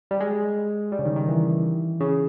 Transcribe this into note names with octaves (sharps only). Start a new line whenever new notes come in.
G3
G#3
G3
C#3
D#3
D#3
E3
C#3